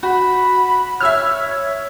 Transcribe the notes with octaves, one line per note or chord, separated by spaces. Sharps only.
F#4 B5
C#5 E5 E6 F6